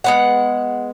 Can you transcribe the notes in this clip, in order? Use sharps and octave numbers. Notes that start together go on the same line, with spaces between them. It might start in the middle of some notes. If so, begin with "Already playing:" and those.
G#3 B3 F#5